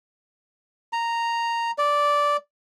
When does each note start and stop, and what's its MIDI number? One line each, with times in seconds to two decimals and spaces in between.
0.93 1.71 82
1.78 2.37 74